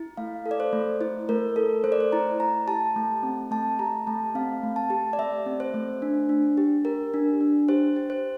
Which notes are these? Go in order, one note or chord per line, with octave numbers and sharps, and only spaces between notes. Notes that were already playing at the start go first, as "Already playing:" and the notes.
Already playing: E4
A3 F5
A4
D5
C5
A3
E4 C5
A3 A#4
A4 A#4
A3 C5
D5
C5
E4 A#5
A3 A#5
G4 A5
A3
C4
A3 A5
G4 A#5
A3 A5
C4 F5
A3
A5
G4
D5
A3 E5
C4
C5
A3
D4
D4
G4
G4 A#4
D4
D4
G4 C5
G4
C5